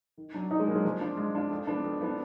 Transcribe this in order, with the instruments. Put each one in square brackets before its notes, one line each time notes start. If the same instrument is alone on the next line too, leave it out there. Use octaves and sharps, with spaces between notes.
[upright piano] D#3
F#3 D4
[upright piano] D#3 [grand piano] D#4
[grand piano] G#3
[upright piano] F#3 [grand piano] A#3
[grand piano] G#3 [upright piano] D4
[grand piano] F3 [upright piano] G#3
[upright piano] D4 F4
G#3
D4 F4
F2
F3 B3 D4
F2
F3 B3 D4